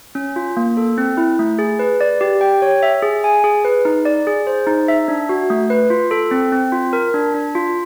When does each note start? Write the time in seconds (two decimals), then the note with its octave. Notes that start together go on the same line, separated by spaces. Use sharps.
0.15 C#4
0.36 F4
0.57 A#3
0.77 A4
0.98 C4
1.17 E4
1.39 A3
1.59 G#4
1.79 B4
2.01 D5
2.21 G4
2.41 G5
2.62 C#5
2.83 E5
3.03 G#4
3.24 G#5
3.44 G#4
3.65 B4
3.85 D#4
4.05 D5
4.27 G#4
4.47 C5
4.67 D#4
4.88 E5
5.08 D4
5.29 F#4
5.50 A3
5.70 B4
5.90 F4
6.11 A4
6.31 C4
6.52 C4
6.72 F4
6.93 A#4
7.14 D4
7.34 D4
7.55 F4